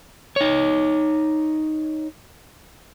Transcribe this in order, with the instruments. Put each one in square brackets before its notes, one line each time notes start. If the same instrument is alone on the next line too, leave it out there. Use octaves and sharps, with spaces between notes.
[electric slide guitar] D#4 C#5